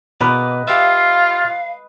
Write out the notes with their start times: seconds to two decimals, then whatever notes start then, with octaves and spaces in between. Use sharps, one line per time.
0.21 B2 B3 A#4 B4 D#5 D6
0.68 F4 G4 E5 F5